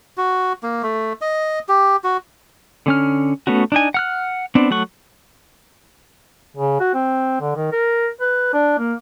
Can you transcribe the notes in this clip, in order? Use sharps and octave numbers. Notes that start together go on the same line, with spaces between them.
F#4
A#3
A3
D#5
G4
F#4
D3 C#4 F6
A3 B3 C#4 F#4
D4 D#4 G#5
F#5 F6 F#6
B3 C4 D4
F#3 A3 F#5 C#6
C#3
F#4
C4
D3
D#3
A#4
B4
D4
A#3